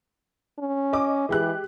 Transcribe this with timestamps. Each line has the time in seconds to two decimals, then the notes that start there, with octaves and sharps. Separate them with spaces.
0.59 C#4
0.93 D#5 D6
1.29 E3 G#3 G4 F#6